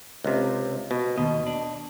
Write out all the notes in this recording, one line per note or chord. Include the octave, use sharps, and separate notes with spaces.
C#2 C3
B2
D#2 B2 D#5
D4